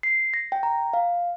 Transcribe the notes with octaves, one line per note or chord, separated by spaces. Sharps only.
C7
A#6
G5
A#5
F5